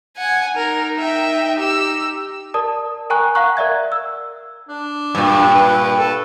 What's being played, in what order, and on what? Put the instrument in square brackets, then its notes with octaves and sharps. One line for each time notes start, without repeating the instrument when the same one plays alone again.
[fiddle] F#5 G#5
[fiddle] D#4 [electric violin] A#4
[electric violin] E5 G5
G4 E6
[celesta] A#4 D5 A5 D#6
A#4 G5 G#5 A#5 C#6 F#6
F5 F#5 A#5 C#6 F#6
A#4 D5 E5 G#6
E6
[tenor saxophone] D4
[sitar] G2 A#2
[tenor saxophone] B4
A4